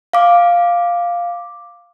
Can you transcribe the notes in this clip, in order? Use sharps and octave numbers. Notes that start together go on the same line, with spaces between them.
F5 D6